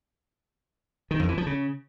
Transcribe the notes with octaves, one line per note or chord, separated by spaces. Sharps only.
D#3
F2
E3
F3
C#3